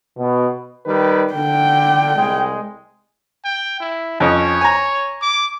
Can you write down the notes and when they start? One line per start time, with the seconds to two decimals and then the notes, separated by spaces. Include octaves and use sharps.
0.17 B2
0.86 D#3 G3 B4
1.34 D3 G5
2.16 C2 G#3
3.45 G5
3.80 E4
4.20 F2 C#4 C#5 D#5
4.61 G#5 A#5
5.22 D6